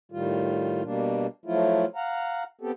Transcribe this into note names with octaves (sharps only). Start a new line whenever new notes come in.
A2 D#3 G3 F4
B2 G3 A#3 D4
F3 F#3 A3 E4 F4
F5 F#5 A#5
B3 C4 G4 A4